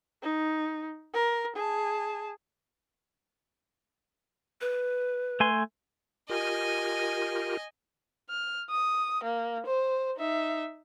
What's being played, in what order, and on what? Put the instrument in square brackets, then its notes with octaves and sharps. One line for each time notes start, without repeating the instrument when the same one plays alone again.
[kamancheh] D#4
A#4
G#4 A5
[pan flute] B4
[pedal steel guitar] A3 G#5 C6
[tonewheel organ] F4 G4 A#4 [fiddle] D#5 G#5
[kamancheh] F6
D#6
A#3
C5
D#4 E5